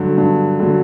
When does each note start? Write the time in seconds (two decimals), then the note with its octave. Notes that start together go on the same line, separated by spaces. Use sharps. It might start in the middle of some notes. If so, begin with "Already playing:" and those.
Already playing: G2 D3 F#3
0.18 G2
0.60 D3 F#3